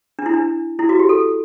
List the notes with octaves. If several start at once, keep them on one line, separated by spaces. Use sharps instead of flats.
D4
E4
D4
E4
F#4
G4
A4